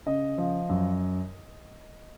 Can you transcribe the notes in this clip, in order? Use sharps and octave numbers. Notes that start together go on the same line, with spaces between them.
C#3 D#5
F3
F#2